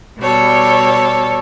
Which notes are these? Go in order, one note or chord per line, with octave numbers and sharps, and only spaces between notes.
B2 G3 A4 C#5